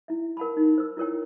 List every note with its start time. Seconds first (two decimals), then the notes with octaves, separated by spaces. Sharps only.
0.08 E4 E5
0.37 A#4 F#5 A5 B5
0.57 D#4
0.78 C5 E6
0.97 E4 F4 A#4 C#5 G5